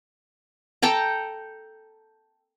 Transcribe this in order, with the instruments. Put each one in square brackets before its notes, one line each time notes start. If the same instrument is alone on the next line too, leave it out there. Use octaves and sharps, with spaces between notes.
[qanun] A4 G5 A5 A#5